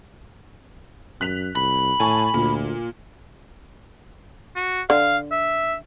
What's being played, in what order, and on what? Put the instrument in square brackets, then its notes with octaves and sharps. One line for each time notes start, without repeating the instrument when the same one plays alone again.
[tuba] F#2 [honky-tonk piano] F#6 B6 F7
[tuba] C2 [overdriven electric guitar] B5
[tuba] A2 [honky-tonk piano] G#5 A5 C#6
[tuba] D2 [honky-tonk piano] A#2
[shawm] F#4
[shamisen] D3 [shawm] F5
[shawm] E5